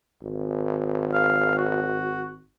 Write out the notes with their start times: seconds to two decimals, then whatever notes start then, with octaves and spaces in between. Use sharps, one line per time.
0.22 G#1
1.14 F5
1.58 F#4